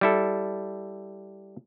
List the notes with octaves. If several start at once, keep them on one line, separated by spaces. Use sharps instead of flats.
G3 E4 A4